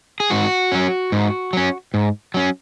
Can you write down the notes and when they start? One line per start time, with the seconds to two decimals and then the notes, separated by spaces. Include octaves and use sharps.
0.20 G#4
0.30 G#2 F#4
0.72 F#3 C#4
1.12 G#2
1.53 F#3 C#4
1.94 G#2
2.34 F#3 C#4